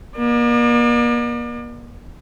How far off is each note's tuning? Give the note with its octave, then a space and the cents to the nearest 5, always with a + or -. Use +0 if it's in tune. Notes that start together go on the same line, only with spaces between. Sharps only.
A#3 +40 D5 +40